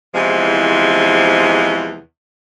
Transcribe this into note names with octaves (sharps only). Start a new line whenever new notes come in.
E2 C3 E3 F3 G#3